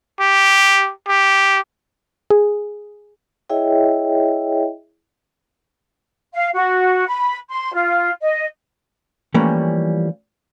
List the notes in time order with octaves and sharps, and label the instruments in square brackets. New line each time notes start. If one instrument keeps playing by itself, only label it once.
[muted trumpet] G4
G4
[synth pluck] G#4
[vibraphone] E4 G#4 C#5 D#5 E5 G5
[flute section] F5
F#4
B5
C6
F4
D#5
[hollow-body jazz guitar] E3 F3 G3 A3 A#3 C#4